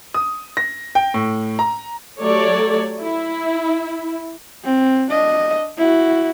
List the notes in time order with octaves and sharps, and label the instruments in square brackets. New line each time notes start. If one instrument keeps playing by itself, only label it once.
[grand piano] D#6
A#6
G5
A2
A#5
[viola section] F#3 A3 G4 A4 C#5 D5
E4
[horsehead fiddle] C4
D4 D#5
E4 F#4